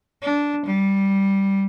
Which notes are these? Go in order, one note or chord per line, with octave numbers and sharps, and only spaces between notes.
D4
G3